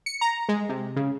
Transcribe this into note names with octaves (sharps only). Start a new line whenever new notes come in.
C#7
A#5
G#3
C3
C#3